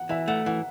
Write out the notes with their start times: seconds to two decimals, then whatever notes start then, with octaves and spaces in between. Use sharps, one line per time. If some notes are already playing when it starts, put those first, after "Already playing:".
Already playing: F#5
0.09 E3 E5
0.28 A3 F#5
0.46 E3 F#5